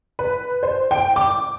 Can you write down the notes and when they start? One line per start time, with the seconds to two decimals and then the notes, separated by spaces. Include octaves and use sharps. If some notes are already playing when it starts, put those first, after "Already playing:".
0.19 B4
0.63 C5
0.91 G5
1.16 D6